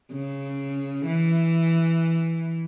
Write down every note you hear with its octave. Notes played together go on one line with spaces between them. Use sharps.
C#3
E3